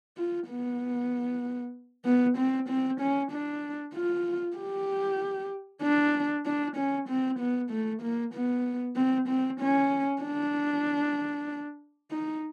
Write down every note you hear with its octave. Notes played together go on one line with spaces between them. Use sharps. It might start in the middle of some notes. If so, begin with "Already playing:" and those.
F4
B3
B3
C4
C4
C#4
D4
F4
G4
D4
D4
C#4
C4
B3
A3
A#3
B3
C4
C4
C#4
D4
D#4